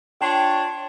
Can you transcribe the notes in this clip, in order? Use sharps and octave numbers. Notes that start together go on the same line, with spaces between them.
D4 F4 C#5 G5